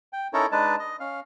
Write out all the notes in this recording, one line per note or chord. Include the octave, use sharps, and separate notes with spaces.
G5
C#4 D#4 E4 A4 A#4 C#5
G#3 D4 D#4 B4 A5
D#5
C#4 F5